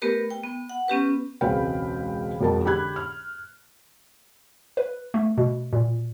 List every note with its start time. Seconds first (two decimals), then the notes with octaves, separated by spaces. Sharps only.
0.02 A3 B3 G4 A#4 B4
0.30 G5
0.44 B3
0.69 F#5
0.88 B3 C#4 G4 B4
1.41 E1 C#2 C4 B4 F5 G5
2.40 E1 F2 A#4 A5
2.64 D3 G4 B5 F#6 G#6
2.96 F6
4.77 B4
5.14 A3
5.38 B2
5.73 A#2